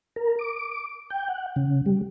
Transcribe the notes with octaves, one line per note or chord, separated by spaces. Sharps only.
A#4
D6
G5
F#5
C#3
G3